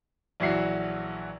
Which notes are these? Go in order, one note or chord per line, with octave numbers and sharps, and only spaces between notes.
A#1 E3 F#3 F#4 E5 C7